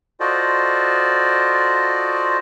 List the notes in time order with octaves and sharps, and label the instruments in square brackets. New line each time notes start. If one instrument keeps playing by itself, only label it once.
[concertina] F4 F#4 A4 C5 D5 D#5